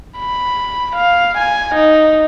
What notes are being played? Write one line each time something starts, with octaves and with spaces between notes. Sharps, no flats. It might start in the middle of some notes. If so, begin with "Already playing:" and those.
B5
F5
G#5
D#4